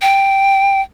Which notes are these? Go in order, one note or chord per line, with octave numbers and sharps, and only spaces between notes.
G5